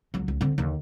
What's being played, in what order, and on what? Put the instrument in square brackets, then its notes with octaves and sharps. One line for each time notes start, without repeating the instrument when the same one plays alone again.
[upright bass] C#2 F#3
C#2
D3 C4
D#2 D3